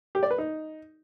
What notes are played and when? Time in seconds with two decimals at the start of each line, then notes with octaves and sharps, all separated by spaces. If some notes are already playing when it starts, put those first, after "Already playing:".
0.15 G4
0.23 D5
0.31 B4
0.38 D#4